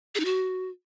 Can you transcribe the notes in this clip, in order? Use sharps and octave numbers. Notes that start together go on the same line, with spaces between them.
G#4
D#4
F#4